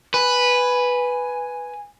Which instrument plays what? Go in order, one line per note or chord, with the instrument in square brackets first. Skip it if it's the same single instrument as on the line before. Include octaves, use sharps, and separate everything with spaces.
[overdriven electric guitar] B4 [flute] G#5